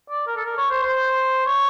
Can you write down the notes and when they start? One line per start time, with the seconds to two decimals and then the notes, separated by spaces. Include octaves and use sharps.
0.10 D5
0.27 A#4
0.36 A4
0.45 A#4
0.57 C#5
0.70 C5
0.83 C5
1.46 C#5